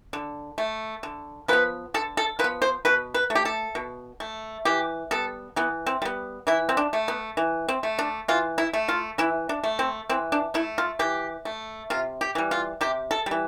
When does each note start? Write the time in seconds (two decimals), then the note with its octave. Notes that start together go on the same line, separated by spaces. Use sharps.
0.13 D3
0.58 A3
1.03 D3
1.48 F3 B3 B4
1.94 D3 A4
2.17 A4
2.39 F3 B4
2.44 B3
2.62 C5
2.85 B2 B4
3.14 B4
3.30 A3
3.35 G4
3.45 A4
3.75 B2
4.20 A3
4.65 E3 G4
5.11 G3 B3 A4
5.56 E3 B3
5.86 C4
6.02 G3 B3
6.47 E3 E4
6.69 C4
6.77 D4
6.93 A3
7.08 B3
7.37 E3
7.68 C4
7.83 A3
7.99 D4
8.28 E3 F4
8.58 E4
8.73 A3
8.88 F4
9.18 E3 E4
9.49 D4
9.64 A3
9.79 C4
10.10 E3 C4
10.32 D4
10.54 A3 E4
10.78 F4
10.99 E3 G4
11.45 A3
11.90 C3 F4
12.21 G4
12.35 E3 G3
12.51 F4
12.81 C3 G4
13.11 A4
13.26 E3 G3